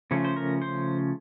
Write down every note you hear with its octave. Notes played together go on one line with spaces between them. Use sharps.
C#3 F3 A3 C#4
C5
A#4
C5